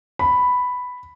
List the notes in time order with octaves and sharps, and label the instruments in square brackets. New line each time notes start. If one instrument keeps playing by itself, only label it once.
[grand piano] B5